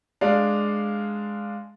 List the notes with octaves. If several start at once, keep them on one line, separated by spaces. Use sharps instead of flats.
G#3 D4 D5 F5